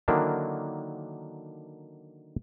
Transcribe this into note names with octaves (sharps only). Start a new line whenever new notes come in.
D3 D#3 F#3 A#3 D4 E4